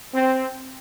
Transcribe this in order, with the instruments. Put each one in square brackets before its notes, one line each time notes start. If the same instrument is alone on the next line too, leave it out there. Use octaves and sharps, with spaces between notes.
[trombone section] C4